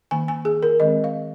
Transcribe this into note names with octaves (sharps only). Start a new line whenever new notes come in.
D#3 A#3 G#5
G#5
G#4
A#4
D#3 G#3 C4 D#5
F5